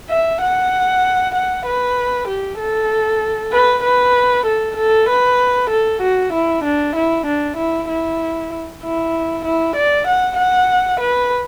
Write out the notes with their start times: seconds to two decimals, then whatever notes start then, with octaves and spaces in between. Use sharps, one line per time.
0.09 E5
0.41 F#5
1.34 F#5
1.66 B4
2.28 G4
2.59 A4
3.52 B4
3.84 B4
4.46 A4
4.77 A4
5.09 B4
5.70 A4
6.01 F#4
6.33 E4
6.64 D4
6.96 E4
7.26 D4
7.57 E4
7.89 E4
8.83 E4
9.45 E4
9.76 D5
10.07 F#5
10.38 F#5
11.00 B4